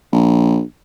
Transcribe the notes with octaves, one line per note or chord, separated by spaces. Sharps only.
A#1